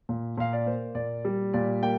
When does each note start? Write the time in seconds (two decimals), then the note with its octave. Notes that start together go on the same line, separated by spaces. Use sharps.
0.09 A#2
0.38 A#2 F5
0.53 D5
0.66 A#3 C5
0.95 A#2 D5
1.25 G3
1.53 A#2 D5
1.83 A#3 G5